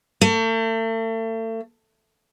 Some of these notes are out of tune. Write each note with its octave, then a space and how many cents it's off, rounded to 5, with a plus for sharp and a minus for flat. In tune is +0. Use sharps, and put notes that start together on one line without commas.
A3 +40